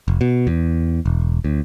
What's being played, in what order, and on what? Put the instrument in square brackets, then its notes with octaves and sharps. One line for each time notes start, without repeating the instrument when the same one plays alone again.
[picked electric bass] F1
B2
E2
E1
D2